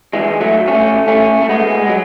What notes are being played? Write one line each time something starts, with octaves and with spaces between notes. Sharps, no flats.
E3 G#3
F#3 A3
A3 C#4
A3 C#4
A3
G#3 B3
G#3
F#3